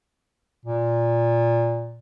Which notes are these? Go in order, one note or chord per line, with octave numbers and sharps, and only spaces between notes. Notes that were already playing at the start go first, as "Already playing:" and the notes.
A#2